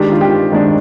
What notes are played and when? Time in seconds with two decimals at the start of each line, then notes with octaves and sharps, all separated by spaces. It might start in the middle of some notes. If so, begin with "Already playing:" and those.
Already playing: D#3 G#3 D4 G4
0.12 F4
0.21 G4
0.52 D#3 G#3 D4